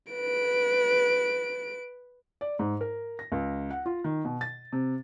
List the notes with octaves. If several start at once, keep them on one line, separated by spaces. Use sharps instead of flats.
B4 D7
D5
G#2
A#4
A#6
C#2
F#5
F4
D#3
B2
A6
C3